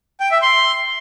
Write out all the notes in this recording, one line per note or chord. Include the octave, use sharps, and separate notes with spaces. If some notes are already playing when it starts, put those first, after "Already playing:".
G5
E5
C6